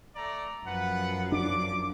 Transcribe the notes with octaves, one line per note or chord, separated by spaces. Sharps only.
A3 D5 A#5
F#2 F3 B4 F#5
D4 D6